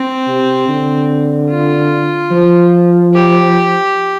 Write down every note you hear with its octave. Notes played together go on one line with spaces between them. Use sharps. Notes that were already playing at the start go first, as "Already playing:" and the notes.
Already playing: C4
C3
D3
F4
F3
G4